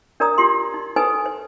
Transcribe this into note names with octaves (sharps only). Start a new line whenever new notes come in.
D4 A#4 D5 A#5 D#6
F4 G4 C6
D#4
D#4 A4 B4 C5 G#5 D#6
C5